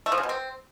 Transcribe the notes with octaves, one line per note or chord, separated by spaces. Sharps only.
A3
F3
C#3
B2
C4